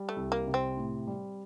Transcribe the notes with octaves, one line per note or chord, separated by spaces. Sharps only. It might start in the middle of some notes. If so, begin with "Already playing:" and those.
Already playing: G3
A3
C2
A#3
C3
C4
A2
G3